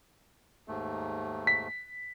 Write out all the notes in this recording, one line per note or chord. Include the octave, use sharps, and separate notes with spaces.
D#2 G#2 A3
B6